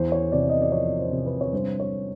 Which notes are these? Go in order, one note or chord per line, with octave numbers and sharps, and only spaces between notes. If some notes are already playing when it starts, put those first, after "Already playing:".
Already playing: E2 C5
C#5
C3 D5
D#5
D5
F3 C#5
C5
C3
B4
C#5
G2 C5
C#5